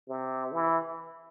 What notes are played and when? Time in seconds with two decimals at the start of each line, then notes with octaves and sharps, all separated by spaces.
0.09 C3
0.52 E3